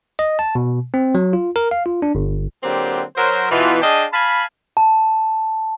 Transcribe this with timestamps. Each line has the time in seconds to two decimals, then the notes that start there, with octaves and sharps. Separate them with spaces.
0.19 D#5
0.39 A5
0.55 B2
0.94 C4
1.15 F#3
1.33 F4
1.56 A#4
1.71 F5
1.86 F4
2.02 D4
2.15 G1
2.63 D3 F#3 A#3 C4 F4 G4
3.16 F#3 A#4 C5
3.51 B2 E3 F4
3.82 D4 G#4 D#5 F5 G5 A5
4.13 F5 G#5 A5 B5
4.77 A5